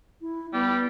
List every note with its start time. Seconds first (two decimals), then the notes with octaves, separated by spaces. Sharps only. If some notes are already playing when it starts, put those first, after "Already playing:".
0.21 E4
0.53 G3 B3